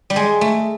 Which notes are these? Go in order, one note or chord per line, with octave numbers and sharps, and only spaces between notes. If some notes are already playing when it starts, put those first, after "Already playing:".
G3
G#3
A3